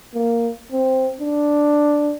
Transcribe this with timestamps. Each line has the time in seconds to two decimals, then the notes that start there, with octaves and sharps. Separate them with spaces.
0.14 A#3
0.71 C4
1.20 D4